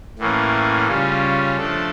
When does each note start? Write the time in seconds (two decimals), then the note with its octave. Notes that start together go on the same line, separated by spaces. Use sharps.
0.19 A2 E3 A#3 C#4
0.88 C#3 G3 C#4 F4
1.57 F3 A3 D4 A4